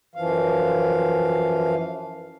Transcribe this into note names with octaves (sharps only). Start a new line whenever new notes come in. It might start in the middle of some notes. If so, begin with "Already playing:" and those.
F#2 E3 F3 F5